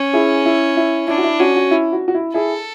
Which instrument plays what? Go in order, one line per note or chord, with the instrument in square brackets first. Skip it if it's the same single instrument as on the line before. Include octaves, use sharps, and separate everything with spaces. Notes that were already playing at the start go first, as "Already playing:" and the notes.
Already playing: [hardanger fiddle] C#4
[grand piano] E4 G#4
E4
E4
[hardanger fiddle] D4 [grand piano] E4
[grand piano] F#4
E4
[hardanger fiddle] C#4 [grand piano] F#4
[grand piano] F#4
E4
F#4
F#4
E4
[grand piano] E4 G#4 [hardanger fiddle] A4